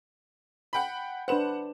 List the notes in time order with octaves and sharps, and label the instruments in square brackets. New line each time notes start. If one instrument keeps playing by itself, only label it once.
[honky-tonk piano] F#5 G5 B5
[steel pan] D4 B4 C5 [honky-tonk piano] F#5 E7